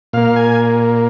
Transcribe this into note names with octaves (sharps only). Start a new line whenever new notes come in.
A#2 A#3 F5
G#5